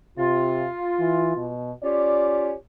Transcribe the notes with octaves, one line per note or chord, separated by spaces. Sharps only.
C3 F4
E3
B2
C#4 F4 G4 D5